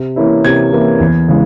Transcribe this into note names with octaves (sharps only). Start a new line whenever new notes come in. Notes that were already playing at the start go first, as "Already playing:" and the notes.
Already playing: C3
E3 A#3 C#4 E4
C3 G#6
E3 A#3 C#4 E4
E2
C#3 E3 G#3